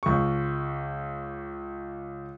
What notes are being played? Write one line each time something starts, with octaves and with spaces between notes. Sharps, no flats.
C#2 C#6